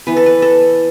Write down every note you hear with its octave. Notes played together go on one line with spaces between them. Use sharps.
E3 B3 B4
A4
B4
A4